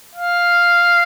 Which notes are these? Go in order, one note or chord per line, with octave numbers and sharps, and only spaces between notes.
F5